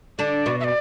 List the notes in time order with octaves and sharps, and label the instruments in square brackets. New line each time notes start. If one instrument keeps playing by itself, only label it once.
[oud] D3 D4 [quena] D5
[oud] B2 B3
[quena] E5
D5